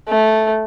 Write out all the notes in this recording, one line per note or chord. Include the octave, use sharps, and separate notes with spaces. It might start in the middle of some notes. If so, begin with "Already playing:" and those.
A3